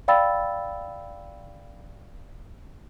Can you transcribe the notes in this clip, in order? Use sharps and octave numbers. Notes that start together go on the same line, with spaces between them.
D5 F5 G5 B5 E6 A6